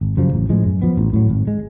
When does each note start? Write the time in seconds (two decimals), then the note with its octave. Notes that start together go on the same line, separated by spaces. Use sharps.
0.01 G#1
0.17 F#2 C#3 F3
0.33 A1
0.49 A2 F3 G#3
0.65 F#2
0.82 F3 B3
0.97 A1
1.13 A2 F#3
1.29 G#1
1.47 G#3